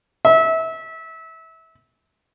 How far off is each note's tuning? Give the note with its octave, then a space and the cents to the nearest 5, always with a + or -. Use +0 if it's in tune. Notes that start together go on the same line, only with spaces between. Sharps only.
E5 -25